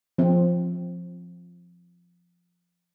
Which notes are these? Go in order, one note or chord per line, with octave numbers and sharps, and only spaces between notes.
F3 C4